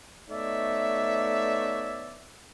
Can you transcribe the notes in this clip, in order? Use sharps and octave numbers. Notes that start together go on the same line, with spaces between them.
A3 B3 D#4 C#5 D5 E5